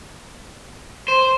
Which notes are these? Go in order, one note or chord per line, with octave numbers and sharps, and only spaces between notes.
C5